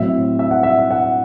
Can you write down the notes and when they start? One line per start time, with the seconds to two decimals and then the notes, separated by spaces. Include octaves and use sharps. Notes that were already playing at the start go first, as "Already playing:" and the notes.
Already playing: A2 F#3 C4 E5
0.39 E5
0.51 F#5
0.63 E5
0.91 F#5